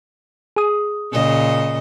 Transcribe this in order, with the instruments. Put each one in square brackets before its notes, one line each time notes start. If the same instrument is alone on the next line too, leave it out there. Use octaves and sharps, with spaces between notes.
[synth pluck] G#4 D#6
[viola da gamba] A#2 C#3 D#5